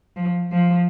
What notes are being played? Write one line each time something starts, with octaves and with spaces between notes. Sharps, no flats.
F3
F3